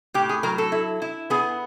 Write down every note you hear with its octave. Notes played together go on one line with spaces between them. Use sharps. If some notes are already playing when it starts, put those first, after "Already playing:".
A2 G4
G#4
F#3 A#4
A4
E4
E4
B3 G#4